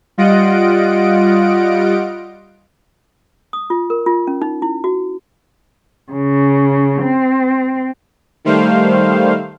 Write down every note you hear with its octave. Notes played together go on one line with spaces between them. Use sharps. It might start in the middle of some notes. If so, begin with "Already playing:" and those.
G3 F4 D#5 F#5 D7
D#6
F4
A#4
F4
C#4
D#4
E4
F#4
C#3
C4
D#3 G3 A3 C5 F5